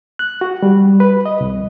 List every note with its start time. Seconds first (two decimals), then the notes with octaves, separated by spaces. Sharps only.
0.19 F#6
0.41 F#4
0.63 G3
1.00 B4
1.26 D#5
1.41 C2